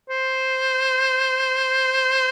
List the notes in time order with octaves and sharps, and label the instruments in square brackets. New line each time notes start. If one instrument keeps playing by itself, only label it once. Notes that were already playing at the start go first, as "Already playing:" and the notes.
[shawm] C5